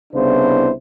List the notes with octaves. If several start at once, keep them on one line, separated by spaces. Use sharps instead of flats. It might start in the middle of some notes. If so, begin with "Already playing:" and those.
C2 C#3 B3 D4 E4 C5